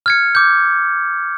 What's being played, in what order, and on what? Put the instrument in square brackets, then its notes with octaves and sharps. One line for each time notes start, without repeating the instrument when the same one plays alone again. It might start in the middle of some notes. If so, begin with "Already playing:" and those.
[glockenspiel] F6 G#6 C#7
D6 G6